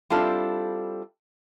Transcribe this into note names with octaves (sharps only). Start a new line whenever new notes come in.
G3 C4 D4 E4 F4 A4